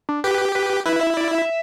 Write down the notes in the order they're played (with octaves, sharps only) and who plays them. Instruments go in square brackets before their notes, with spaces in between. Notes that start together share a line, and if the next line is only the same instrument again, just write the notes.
[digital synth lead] D4
[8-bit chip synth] G4 [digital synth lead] B4
[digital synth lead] B4
[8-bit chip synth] E4 [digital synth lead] B4
[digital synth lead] E5
D5
E5